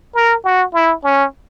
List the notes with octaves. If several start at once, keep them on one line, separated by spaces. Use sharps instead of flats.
A#4
F#4
E4
C#4